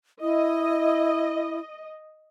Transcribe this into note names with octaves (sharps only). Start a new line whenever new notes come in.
E4 D#5